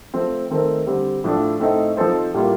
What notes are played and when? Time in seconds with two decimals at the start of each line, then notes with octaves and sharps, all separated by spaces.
0.14 F3 A3 C4
0.51 D#3 A3 C4 D#4 A#4
0.87 D3 G3 C4
1.24 A2 F3 A3 D4
1.60 A2 A3 C4 D#4
1.97 F3 C4 D#4 A4 C5
2.34 A2 G3 A#3 F4